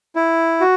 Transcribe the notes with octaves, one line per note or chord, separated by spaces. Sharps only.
E4
F#4